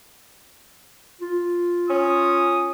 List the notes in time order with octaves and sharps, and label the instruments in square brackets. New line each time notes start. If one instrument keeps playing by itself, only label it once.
[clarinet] F4
[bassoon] C#4 [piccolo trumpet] D#6